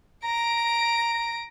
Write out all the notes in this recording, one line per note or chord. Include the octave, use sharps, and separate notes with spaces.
A#5 A#6 D7